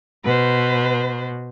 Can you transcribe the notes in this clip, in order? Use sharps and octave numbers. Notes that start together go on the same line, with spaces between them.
B2 B4 C5